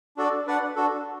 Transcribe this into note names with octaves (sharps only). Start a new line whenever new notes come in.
D4 F#4 A4 D5
D4 B4 D5 F#5
D4 F#4 A4